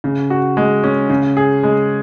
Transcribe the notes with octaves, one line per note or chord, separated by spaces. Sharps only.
C#3
F#4
G#3
C#4
C#3
G#4
G#3